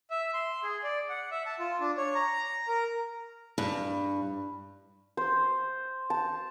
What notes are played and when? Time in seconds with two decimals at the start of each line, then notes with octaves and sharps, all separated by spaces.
0.11 E5
0.34 C6
0.63 G#4
0.83 D5
1.09 F#5
1.31 E5
1.46 A5
1.59 F4
1.80 D4
1.97 C#5
2.15 A#5
2.68 A#4
3.58 G2
5.17 C5
6.10 A5